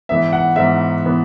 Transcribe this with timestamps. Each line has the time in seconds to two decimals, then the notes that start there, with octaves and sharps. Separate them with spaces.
0.09 G#2 E3 B3 E5
0.33 F#5
0.56 G#2 E3 B3 E5
1.05 E3 B3